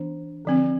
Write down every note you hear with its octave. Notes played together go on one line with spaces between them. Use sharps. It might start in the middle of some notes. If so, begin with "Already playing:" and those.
Already playing: E3 B3 D4
D3 F3 C4